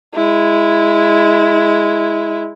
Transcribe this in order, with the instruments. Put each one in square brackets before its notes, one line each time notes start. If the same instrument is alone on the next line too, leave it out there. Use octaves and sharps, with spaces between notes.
[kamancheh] G#3 E4